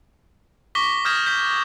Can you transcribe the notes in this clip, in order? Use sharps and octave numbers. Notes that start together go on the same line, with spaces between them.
C#6 D6 A#6 B6 G7
D#6 F6 G6 G#6 A#6 E7
G6 B6